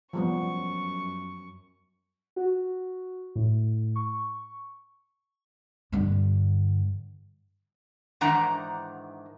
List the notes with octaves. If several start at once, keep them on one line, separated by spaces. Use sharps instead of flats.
F#2 F3 G3 B3 C#6
F#4
A2
C#6
G2 D3
G#2 D#3 E3 D4 F#5 A#5